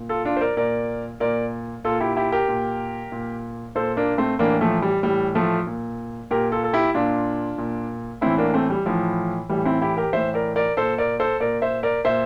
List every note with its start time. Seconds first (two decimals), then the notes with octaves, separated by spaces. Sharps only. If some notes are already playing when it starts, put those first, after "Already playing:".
Already playing: A#2
0.09 F4 A4
0.25 D4 F4
0.37 C5
0.41 A#4 D5
0.57 A#2 A#4 D5
1.20 A#2 A#4 D5
1.85 A#2 F4 A4
2.01 E4 G4
2.16 E4 G4
2.32 G4 A#4
2.48 A#2
3.12 A#2
3.75 A#2 A4 C5
3.97 A#3 D4
4.18 A3 C4
4.39 A2 E3 A#3 D4
4.61 F3 A3
4.82 G3
5.03 A2 E3 G3
5.35 F3 A3
5.67 A#2
6.31 A#2 G4 A#4
6.52 F4 A4
6.64 A4
6.73 E4 G4
6.94 A#2 D4 F4
7.58 A#2
8.21 A2 E3 C4 E4
8.38 A#3 D4
8.54 A3 C4
8.70 G3
8.86 A2 E3 F3
9.49 A2 E3 G3
9.65 C4 E4
9.81 E4 G4
9.97 G4 A#4
10.13 A2 E3 C5 E5
10.34 A#4 D5
10.56 A#4 D5
10.77 A#2 A4 C5
10.98 A#4 D5
11.20 A4 C5
11.40 A#2 A#4 D5
11.62 C5 E5
11.83 A#4 D5
12.05 A#2 C5 E5